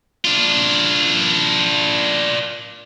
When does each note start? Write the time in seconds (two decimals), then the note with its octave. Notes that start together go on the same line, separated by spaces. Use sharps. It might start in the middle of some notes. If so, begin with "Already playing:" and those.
0.25 D4 F4